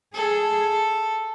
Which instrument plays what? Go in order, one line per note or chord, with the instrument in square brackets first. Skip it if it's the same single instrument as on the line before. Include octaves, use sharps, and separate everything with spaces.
[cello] G#4 [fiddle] A4